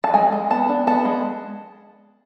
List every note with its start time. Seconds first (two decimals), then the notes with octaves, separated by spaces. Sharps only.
0.04 A5
0.14 G#3 G#5
0.32 G#3
0.50 B3 A5
0.69 D4
0.87 B3 A5
1.05 G#3